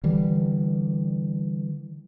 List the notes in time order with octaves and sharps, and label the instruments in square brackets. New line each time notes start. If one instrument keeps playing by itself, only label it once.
[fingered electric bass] D3 E3 G3